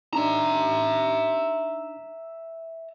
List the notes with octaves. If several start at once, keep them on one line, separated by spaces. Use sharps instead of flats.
D4 D#4 E5 A#5